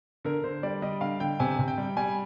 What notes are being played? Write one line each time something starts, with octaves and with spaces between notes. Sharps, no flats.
D3 A#4
D3 C5
G3 D5
G3 D#5
D3 F5
D3 G5
C3 G#5
C3
G5
G3
G3 G#5